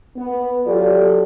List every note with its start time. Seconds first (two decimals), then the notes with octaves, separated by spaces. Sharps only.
0.17 B3
0.67 F#3 F4 G4 A4 D5